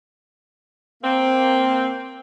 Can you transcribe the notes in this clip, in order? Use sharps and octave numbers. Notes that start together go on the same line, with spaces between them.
A#3 C4